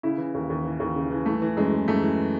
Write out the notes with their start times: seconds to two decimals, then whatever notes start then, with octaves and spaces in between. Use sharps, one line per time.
0.03 C#3 E4
0.18 E3
0.34 D#2
0.50 D#2
0.65 E3
0.80 D#2
0.95 C#3
1.11 E3
1.25 E3 A3
1.42 E3
1.57 F#2 G#3
1.72 E3
1.88 F#2 A3
2.02 E3